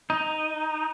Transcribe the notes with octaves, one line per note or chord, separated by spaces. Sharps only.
D#4